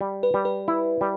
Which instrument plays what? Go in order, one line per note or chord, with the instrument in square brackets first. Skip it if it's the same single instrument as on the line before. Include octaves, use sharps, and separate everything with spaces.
[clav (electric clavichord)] G3
[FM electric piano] B4
[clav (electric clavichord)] G3
[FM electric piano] B4
[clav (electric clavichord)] E4
G3